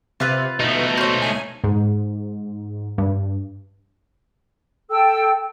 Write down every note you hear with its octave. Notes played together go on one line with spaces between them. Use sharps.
C3 F4 B4
B2 A3 D#4
C5 C#5
G#5
G#2
G2
A4 G5 E6